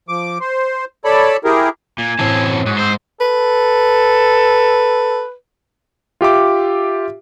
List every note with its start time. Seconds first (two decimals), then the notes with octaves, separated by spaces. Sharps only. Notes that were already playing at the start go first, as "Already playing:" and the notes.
0.09 F3 D6
0.40 C5
1.05 A4 C#5 D5 A5 B5
1.44 E4 G4 G#4 A#4
1.99 A#2 G#5
2.19 F#2 A2 E3 C4 A5
2.66 G#2 F#4
2.79 C4 C5
3.21 A4 B4
6.21 F4 G4 E5 D6